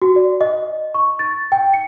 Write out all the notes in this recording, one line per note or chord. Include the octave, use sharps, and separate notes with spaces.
F#4
D5
D#5
C#6
A6
G5
C#7